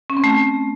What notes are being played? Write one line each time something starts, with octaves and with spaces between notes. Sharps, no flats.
C#4
C4
A3